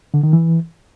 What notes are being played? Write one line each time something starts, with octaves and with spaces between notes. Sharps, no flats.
D3
D#3
E3